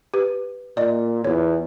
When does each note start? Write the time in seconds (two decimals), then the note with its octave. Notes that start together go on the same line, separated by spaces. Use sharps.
0.14 G4 B4
0.77 A#2 D5 D#5
1.24 E2 F4 C#5